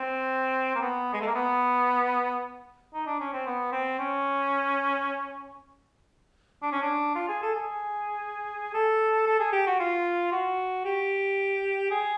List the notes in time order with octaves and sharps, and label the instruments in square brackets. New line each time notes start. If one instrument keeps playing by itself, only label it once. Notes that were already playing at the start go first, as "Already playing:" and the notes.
Already playing: [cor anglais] C4
A#3
B3
G#3
A3
A#3
B3
D#4
D4
C#4
C4
B3
C4
C#4
D4
C#4
D4
F4
G#4
A4
G#4
A4
A4
G#4
G4
F#4
F4
F#4
G4
G#4